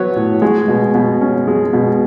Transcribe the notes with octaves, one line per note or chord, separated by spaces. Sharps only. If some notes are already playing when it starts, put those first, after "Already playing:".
Already playing: F#3 B3 B4 C#5
A2
G#3
B2
B2
C#4
G#3
B2